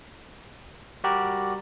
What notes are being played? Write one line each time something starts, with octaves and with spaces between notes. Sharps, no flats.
G3 F#4 G4 A#4 D5